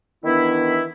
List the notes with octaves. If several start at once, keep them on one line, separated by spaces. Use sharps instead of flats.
D#3 E3 B3 D4 E4